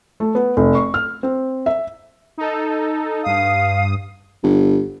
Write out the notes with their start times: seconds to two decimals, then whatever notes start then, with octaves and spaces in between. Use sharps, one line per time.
0.20 A3
0.35 B3
0.57 F1
0.75 C#6
0.94 F6
1.23 C4
1.66 E5
2.38 D#4 A4
3.24 G2 F5 D#6
4.43 G1